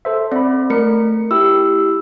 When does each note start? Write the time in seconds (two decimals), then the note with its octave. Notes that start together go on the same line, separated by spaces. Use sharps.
0.05 A4 C5 E5
0.32 C4 D5 B5
0.70 A3 A#4 C#7
1.31 E4 G4 E6